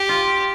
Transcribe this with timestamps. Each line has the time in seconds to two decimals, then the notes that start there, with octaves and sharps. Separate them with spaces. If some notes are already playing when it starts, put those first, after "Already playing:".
Already playing: G4
0.09 F4